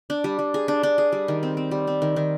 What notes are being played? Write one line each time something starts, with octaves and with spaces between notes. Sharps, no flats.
D4
G3
G3
G#4
D4
D4
G#4
G3
D#3
C4
C4
G3
C4
D#3
D#3